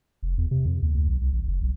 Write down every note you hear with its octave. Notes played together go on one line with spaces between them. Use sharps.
F1
E2
C3
F2
D#2
D2
B1
C2
A1
F#1
B1